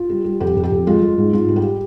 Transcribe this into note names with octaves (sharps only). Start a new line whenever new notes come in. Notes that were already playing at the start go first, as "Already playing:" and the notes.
Already playing: F4
G3
G3
F2 G4
F2
G4
F2
G#3 F4
G#3
G#2
G#2 F4
G3
G4